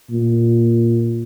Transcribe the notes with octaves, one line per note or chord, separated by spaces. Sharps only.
A#2